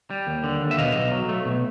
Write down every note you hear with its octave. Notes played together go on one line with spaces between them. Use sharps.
G3
D#2
D3
D#2
E5
B2 D#5 F5
B1
F#3
A3
B2